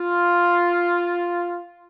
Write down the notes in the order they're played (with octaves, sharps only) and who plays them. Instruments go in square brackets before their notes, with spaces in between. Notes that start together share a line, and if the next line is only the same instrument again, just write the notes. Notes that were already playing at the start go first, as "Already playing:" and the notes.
Already playing: [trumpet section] F4